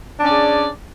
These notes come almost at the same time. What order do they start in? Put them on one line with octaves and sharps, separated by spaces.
D4 C#4 D5 G#4